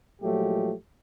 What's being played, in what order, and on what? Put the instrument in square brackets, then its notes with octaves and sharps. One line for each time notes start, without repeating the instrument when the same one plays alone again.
[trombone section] A#2 F3 F#3 G#3 A3 G4